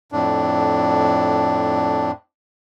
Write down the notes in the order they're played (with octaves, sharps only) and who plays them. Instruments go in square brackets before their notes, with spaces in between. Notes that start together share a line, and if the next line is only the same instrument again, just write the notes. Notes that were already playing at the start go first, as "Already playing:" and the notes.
[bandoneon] F2 A2 D4